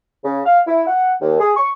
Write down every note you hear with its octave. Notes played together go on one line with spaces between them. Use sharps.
C#3
F5
E4
F#5
D#2
G#4
C#6